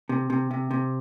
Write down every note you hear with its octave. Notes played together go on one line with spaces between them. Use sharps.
C3
C3
C3
C3